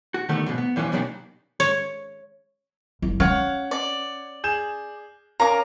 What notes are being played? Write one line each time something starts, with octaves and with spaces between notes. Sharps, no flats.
F#4
D3 D#3 G3 A3 B3
G#2 B2 F3
B3
E2 G2 E3 F3 C#4
B2 D#3 F#3 G3 A#3 C#4
C#5
F#1
C#4 C#5 F5 F#5
D5
G#4 G6 E7
C#4 A#4 F5 A#5 D6